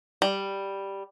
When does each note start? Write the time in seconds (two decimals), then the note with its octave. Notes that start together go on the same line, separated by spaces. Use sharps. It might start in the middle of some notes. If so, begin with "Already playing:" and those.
0.22 G3